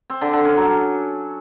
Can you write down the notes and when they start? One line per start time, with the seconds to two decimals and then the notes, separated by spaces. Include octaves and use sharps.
0.10 C4
0.21 D3
0.33 D3
0.45 C#4
0.57 F#3